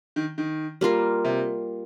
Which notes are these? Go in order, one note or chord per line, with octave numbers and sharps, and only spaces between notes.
D#3
D#3
G3 A#3 F4 A#4
C3